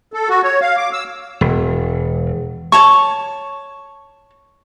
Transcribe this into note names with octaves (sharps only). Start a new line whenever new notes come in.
A4
F#4
C#5
F5
D6
E6
E1
C#5 A5 C#6